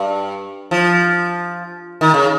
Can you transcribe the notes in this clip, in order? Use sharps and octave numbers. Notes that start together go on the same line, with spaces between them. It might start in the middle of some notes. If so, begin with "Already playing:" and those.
Already playing: G2
F3
D#3
C#3